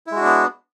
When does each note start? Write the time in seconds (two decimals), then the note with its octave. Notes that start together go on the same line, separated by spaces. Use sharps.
0.07 E4
0.11 G#3
0.16 F#4
0.21 D4
0.25 B3